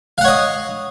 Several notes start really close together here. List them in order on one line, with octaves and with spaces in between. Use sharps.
F5 F#5 C#5 D#5